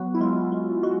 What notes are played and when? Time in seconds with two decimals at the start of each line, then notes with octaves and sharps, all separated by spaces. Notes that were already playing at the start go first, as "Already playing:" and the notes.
Already playing: F#3 B3 F#4
0.14 E4
0.21 G#3 F4
0.52 G#3
0.83 G#3 F#4